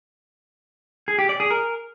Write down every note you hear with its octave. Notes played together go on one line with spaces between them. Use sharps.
G#4
G4
D5
G#4
A#4